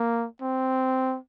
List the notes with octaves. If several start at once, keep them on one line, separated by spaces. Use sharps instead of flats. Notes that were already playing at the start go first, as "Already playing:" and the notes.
Already playing: A#3
C4